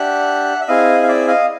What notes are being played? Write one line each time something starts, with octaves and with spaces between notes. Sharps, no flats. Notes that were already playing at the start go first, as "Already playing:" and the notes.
Already playing: D4 G4 E5 F#5
E5
C4 E4 G#4 D#5 F5
F5
D5 E5
D#5 F5